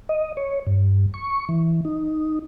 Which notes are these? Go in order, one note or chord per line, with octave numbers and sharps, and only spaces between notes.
D#5
C#5
G2
C#6
E3
D#4